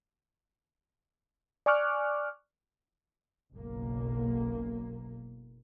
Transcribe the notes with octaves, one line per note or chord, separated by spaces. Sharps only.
D5 G#5 C#6 D6 F6 F#6
F#1 B1 A#3